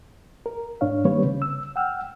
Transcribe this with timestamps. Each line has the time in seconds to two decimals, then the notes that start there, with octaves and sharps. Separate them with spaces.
0.46 A#4
0.81 G#2 D4 C#5 F5
1.05 D#3 G3 A#3 C4 B4 C#5
1.24 C#3
1.42 E6
1.76 F#5 G5 E6 F6